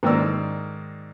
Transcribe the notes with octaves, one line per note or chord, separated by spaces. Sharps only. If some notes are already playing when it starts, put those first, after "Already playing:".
G#2 D#3 A#3 A#4 D5 E6